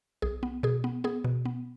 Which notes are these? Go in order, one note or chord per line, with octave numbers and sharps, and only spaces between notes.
B1 G#4
B3
B2 G#4
B3
B3 G#4
B2
B3